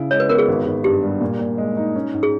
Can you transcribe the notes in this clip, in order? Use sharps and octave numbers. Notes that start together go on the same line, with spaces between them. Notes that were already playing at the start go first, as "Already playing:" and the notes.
Already playing: C#3 E4
G#3 C#5
B4
B3 A#4
G#4
G#1
G#1
G2 G4
G3
A#2
A#2
G#3
D#4
C#4
G#2
G#4